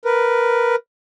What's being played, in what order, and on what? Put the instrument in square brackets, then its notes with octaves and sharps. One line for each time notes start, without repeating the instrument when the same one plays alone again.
[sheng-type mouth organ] A#4 B4